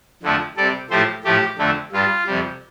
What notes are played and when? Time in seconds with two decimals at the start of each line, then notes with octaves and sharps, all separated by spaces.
0.23 F2 D3 F3 A3
0.56 C3 G3 A4 D5
0.90 A2 F3 A3 G4 C5
1.24 A2 F3 A3 G4
1.58 F2 D3 A3
1.92 G2 G3 F4
2.27 F2 C3 G3